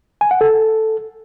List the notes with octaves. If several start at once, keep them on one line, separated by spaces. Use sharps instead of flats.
G#5
F#5
A4